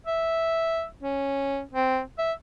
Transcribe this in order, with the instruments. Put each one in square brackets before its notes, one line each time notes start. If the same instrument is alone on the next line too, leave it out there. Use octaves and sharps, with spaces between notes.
[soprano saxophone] E5
C#4
C4
E5